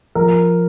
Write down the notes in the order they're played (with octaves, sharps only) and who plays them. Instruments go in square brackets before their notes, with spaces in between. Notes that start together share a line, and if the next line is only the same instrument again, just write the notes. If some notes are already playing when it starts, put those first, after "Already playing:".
[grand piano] F3 A#4